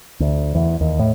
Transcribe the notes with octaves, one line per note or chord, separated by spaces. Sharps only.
D2
E2
D#2
A2